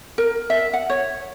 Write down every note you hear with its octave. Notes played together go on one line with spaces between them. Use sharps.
A#4
E5
F#5
C#5